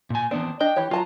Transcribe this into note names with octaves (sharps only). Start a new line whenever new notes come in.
A#2 G#5
E3 B3 C4 D4
D4 D#5 G5
E3 G4 C#5
F#3 F4 A5 A#5